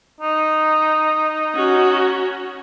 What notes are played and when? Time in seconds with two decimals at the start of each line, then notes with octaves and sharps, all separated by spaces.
0.21 D#4
1.55 C#4 F#4